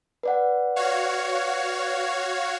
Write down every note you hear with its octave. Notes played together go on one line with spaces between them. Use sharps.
B4 D5 F#5
F#4 C#5 F5